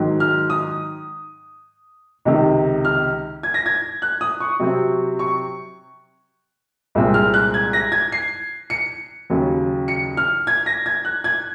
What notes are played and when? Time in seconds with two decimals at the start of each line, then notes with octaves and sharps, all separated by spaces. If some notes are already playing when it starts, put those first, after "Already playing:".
Already playing: G#2 D#3 F#3
0.20 F6
0.50 D#6
2.25 C#2 C3 D#3
2.85 F6
3.43 G#6
3.54 A#6
3.66 G#6
4.02 F#6
4.21 D#6
4.40 C#6
4.60 C3 F#3 C4
5.19 C#6
6.95 C2 A#2 G#3 C4
7.14 F6
7.34 F#6
7.54 G#6
7.73 A#6
7.92 G#6
8.12 C7
8.70 C#7
9.30 D#2 C#3 F#3
9.88 C#7
10.17 F6
10.47 G#6
10.66 A#6
10.86 G#6
11.05 F#6
11.24 G#6